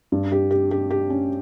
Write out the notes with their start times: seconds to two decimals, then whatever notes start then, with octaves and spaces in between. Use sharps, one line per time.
0.12 G2
0.32 G4
0.51 G4
0.71 G4
0.91 G4
1.10 C#4